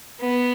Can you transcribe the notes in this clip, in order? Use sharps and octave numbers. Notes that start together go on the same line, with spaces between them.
B3